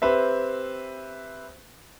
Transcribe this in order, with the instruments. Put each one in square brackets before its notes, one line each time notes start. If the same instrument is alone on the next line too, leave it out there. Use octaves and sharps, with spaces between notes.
[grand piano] C4 G4 B4 C5 E5